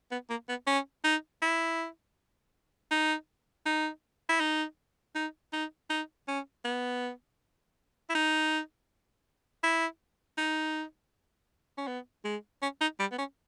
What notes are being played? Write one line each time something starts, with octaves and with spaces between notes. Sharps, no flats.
B3
A#3
B3
C#4
D#4
E4
D#4
D#4
E4
D#4
D#4
D#4
D#4
C#4
B3
E4
D#4
E4
D#4
C#4
B3
G#3
C#4
D#4
G3
B3
C#4